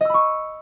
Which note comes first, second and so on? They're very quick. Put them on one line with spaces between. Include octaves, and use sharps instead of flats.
D#5 E6 B5 C#6